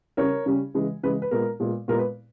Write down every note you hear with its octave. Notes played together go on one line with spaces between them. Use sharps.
C#3 G3 C#4 A#4 C#5
C#3 G3 C#4
C#3 E3 G#3
C#3 E3 G#3 B4
B4
A#2 G#3 B3 A#4
A#2 G#3 B3
A#2 G#3 B3 A#4
B4